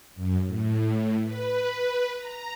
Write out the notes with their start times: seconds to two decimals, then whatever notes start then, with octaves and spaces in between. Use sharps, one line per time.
0.15 F#2
0.46 A2
1.23 B4
2.15 A#5